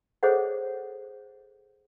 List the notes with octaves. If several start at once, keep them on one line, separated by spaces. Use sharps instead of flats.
G#4 A4 C5 C#5 D#5 F#5